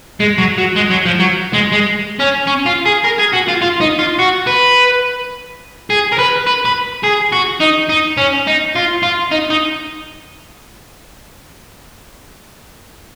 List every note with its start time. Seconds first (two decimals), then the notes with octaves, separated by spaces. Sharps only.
0.20 G#3
0.38 F#3
0.58 F#3
0.76 G#3
0.90 F#3
1.06 F3
1.19 F#3
1.53 G#3
1.72 G#3
2.19 C#4
2.47 C#4
2.66 F4
2.85 G#4
3.04 A#4
3.18 G#4
3.33 F#4
3.48 F4
3.61 F4
3.81 D#4
3.99 F4
4.19 F#4
4.47 B4
5.90 G#4
6.12 A#4
6.18 B4
6.46 B4
6.65 B4
7.03 G#4
7.32 F#4
7.61 D#4
7.89 D#4
8.17 C#4
8.47 D#4
8.75 F4
9.03 F4
9.32 D#4
9.50 D#4